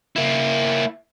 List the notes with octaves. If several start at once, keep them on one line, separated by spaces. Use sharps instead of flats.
A#3 E4